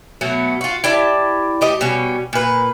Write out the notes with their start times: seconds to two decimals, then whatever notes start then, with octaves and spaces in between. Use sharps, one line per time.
0.21 B2 F#3 A3 B3
0.61 F4 F#4
0.84 E4 G4 D5 A5
1.61 A3 G4 D#5
1.81 B2 G3 C#4
2.33 A#2 B4